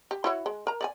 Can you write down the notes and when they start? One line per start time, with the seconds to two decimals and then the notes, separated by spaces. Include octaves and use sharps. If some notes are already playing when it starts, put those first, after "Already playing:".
0.11 G4
0.24 E4 F#4 C#5
0.46 G#3
0.67 A#4 A#5
0.81 D5 D#5 G#5